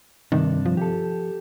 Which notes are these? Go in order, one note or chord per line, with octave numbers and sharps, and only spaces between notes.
G2 C3 D#3 D4
F3
G4 A4